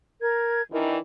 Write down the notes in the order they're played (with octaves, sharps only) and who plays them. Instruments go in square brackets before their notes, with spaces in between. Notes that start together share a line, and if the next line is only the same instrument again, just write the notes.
[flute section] A#4 G#6
[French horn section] D#3 E3 D4 [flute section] A#4